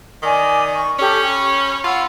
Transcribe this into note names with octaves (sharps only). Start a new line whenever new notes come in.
D#3 D5 G#5 D6
C#6
C#4 G4 A4
B5
F4 F#5 B5 E6